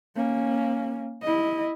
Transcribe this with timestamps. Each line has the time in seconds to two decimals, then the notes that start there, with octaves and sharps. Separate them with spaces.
0.16 A#3 C#4
1.22 E4 D#5